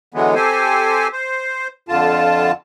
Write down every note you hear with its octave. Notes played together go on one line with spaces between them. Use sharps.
D3 E3 F#3 G#3 B3
C4 G4 A4 C5 G#5
C5
F2 D3 F4 A5